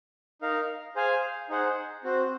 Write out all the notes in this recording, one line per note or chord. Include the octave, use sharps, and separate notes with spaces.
D#4 A#4 F5
G#4 C5 F5 G#5
D#4 G#4 C5 F#5
C4 F#4 C5